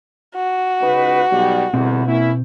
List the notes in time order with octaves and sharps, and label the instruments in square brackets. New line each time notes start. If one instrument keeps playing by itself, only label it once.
[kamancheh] F#4
[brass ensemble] C#2 D#4 B4
B1 B2 G3
[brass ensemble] G1 E2 E4 [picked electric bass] B2 C4
[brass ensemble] A#3 C#4 E4